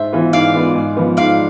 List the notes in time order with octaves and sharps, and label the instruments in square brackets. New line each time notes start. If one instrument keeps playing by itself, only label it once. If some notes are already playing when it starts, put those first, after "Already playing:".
Already playing: [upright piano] G#2 [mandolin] C5 E5
[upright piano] E3 B3 F4
[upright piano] G#2 [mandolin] D5 F5
[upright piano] E3 B3 F4
G#2
F3 B3
[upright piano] G#2 [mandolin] D5 F5